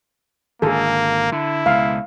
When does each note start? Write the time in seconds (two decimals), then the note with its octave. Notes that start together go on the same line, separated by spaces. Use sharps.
0.62 G#1 D3 A#3 G#4 A4
1.32 D3 E4
1.66 C#2 B2 F5